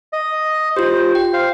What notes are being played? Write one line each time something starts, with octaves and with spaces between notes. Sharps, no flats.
D#5
F4 G4 C5
G5
C5 F5